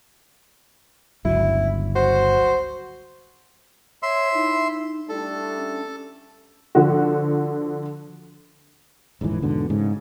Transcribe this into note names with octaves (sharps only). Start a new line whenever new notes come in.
G1 C#2 F#3 E4
F#4 C5
C#5 E5 C6
D#4 E4
G3 A3 D4 E4 A4
C#4
D3 F3 F#4
D#1 A1 G#2 E3
E2 G#2 B2 D3
G#2 C#3